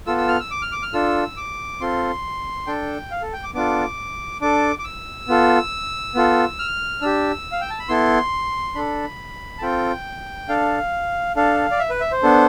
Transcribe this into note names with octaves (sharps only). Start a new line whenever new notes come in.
B3 F4 A4 E6
E6
F6
E6
D6
F6
D6
F6
D4 F4 A4 E6
D6
C4 F4 A4 C6
D4 A4 G5
F5
A4
G5
D6
B3 D4 F4 A4 D6
D4 A4 D6
D6
E6
B3 F4 A4
B3 F4 A4
F6
D4 G4 E6
F5
G5
A5
B5
B3 E4 A4 C6
D4 A4 B5
A5
C4 F4 A4 G5
D4 A4 F5
D4 A4 F5
D5
E5
B4
E5
C5
B3 D4 A4